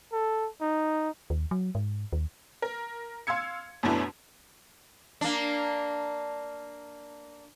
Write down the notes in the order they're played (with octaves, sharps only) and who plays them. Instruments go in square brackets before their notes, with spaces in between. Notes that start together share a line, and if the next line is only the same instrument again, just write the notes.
[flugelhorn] A4
D#4
[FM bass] D#2
F#3
G#2
D#2
[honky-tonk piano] A#4
F5 C6 E6 G#6 C#7
F#2 B2 A3 B3 D4 E4
[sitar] A#3 D4